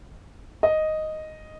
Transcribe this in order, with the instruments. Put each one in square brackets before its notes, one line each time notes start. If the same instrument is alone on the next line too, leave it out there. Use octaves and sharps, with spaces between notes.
[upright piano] D#5